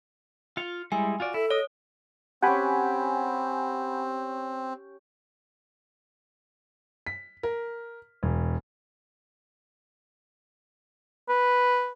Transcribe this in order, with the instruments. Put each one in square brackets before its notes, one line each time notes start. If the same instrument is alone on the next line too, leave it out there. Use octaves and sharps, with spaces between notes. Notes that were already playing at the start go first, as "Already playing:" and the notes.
[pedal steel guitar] F4 F5 [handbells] C#7
[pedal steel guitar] G3 G#3 E4 [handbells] G#5
[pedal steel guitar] F4 F#4 D5
[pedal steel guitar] E4 [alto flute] A4
[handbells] C#5 D#6 [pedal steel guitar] D#5
[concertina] C4 [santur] C#4 G4 [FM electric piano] F#5 G#5 B5
[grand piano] B6
A#4
E1
[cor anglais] B4